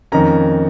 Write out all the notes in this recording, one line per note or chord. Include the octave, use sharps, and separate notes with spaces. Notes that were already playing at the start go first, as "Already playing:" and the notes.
F2 D#3 A#3 C#4 A#5